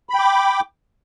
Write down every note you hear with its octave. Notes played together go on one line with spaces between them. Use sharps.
G5 B5 D6